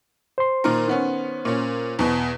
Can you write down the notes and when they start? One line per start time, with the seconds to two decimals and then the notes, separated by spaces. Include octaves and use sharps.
0.38 C5 C6
0.64 A#2 D#3 A#4
0.87 D#3 B3 C#4
1.45 A#2 C#4
1.99 E2 B2